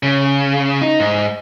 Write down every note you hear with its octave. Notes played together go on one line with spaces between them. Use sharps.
C#3
D#4
G#2